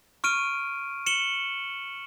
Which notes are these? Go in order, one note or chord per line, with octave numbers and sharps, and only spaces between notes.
C#6 F6 D7 D#7
C#7 E7 F#7 G7